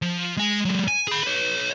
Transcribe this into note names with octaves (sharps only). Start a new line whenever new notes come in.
F3
G#3 G#5
F#3 G#3
G#5
G#4 B5
B4 C#5